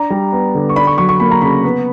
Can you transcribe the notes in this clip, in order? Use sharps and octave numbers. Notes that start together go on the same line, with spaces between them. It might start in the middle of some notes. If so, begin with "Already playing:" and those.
Already playing: D4 A#5
G3
B3
D3
C#6
D4 B5
C#6
F#3 C#6
C#6
A#3 B5
A#5
C#3 B5
B3